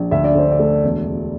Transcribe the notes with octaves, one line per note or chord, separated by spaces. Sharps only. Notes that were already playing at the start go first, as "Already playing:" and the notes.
Already playing: A#1
D2 E5
D5
D3 C5
D5
A3
E1
E1